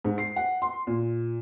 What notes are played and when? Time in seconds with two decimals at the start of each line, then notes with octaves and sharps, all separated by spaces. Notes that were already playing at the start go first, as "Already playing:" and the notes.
0.05 G#2
0.18 C7
0.36 F#5
0.62 C6
0.87 A#2